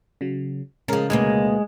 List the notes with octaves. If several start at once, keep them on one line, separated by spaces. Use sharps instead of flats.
C#3 F#3
C#3 F3 G#3 C#4 A#4
D2 B2 G#3 A#3